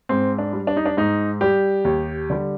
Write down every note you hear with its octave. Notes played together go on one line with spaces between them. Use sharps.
G#2 C4
D4
G3
D4
D#4
D4
G#2 D#4
G3 G4
D#2
D3 G3